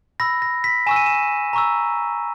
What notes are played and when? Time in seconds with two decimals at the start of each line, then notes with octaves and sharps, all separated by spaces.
0.20 B5 E6 A#6
0.42 A#6
0.64 B6
0.86 G#5 C#6 E6 E7
0.96 D#7
1.06 E7
1.53 A#5 C#6 E6